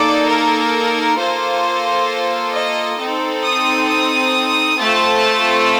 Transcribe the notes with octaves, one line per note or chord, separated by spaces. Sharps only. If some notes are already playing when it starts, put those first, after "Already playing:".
Already playing: A#3 D#4 A4 D5
A#4
A#3 F4 A4 C5
D#5
C4 D#4 A4
D#6
D#6
A3 C4 F4 A4 A5